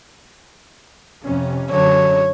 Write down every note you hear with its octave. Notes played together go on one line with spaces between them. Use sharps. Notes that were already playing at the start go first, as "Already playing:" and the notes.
F2 C3 C#4
F#2 D3 F#3 C#5